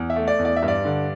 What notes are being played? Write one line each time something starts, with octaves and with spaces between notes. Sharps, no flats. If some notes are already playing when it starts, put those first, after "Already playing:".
Already playing: E2
E5
A3
D5
E2
D5
E5
G2
D5
D3